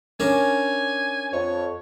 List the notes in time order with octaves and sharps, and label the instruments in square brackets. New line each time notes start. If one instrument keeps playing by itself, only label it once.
[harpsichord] C#4 D4 A#4 [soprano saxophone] G#5
[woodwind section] F2 [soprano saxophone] C#5